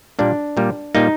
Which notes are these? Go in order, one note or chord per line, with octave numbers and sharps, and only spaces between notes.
A#2 G3 A#3 D4
A#2 G3 A#3
A#2 G3 A#3 D#4